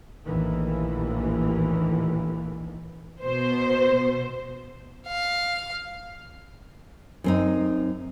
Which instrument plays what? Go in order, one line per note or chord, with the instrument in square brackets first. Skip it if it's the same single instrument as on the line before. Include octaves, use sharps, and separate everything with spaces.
[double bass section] A#1 D#2 A2 E3
[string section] B2 C5
[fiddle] F5
[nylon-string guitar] F#2 C4 D#4